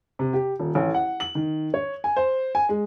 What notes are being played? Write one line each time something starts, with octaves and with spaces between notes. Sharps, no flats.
C3
G4
D#1
A1
F#5
F#7
D#3
C#5
G#5
C5
G#5
G#3